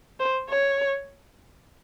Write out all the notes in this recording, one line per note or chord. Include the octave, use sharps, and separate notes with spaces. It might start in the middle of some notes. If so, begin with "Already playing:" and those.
C5
C#5